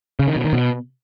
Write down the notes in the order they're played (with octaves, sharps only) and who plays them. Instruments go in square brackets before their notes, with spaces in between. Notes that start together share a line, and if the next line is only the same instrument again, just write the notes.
[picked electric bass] C#3
D#3
B2
D#3
B2